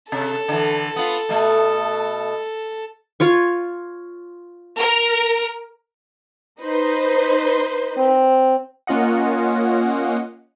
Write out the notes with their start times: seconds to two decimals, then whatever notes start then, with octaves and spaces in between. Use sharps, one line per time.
0.12 C3 A4
0.48 D3 E3
0.96 B3 F4
1.29 B2 A3
3.20 F4 C#5 C#6
4.78 A#4
6.61 D#4 B4 C5
7.98 C4
8.87 A#3 C#4 F4 D#5 F#5